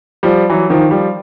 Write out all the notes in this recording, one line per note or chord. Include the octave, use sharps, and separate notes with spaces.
F3 G3
E3 F#3
D#3 F3
F3 G3